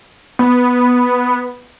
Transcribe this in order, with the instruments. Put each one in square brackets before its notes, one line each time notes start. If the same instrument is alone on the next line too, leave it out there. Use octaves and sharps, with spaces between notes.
[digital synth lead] B3